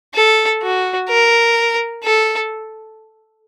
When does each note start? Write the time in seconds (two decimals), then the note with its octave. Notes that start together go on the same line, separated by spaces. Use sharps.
0.15 A4
0.62 F#4
1.10 A#4
2.04 A4